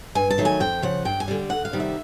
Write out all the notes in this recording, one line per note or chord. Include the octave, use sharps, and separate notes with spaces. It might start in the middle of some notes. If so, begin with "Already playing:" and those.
G2 G#5
A5
D#3 F#3 A3
G#5
F2 G5
C#3 F3 F#5
G2 G5
G#5
D3 G3
D2 F#5
F5
C3 D#3 G3
E5